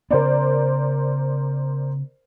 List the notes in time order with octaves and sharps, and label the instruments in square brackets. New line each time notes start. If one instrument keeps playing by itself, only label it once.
[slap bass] C#3 B3 [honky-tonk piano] A#4 C5 D5